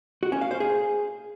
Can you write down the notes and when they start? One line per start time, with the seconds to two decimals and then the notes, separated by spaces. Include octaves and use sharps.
0.23 F#4
0.32 C#4
0.41 F5
0.51 C5
0.60 G#4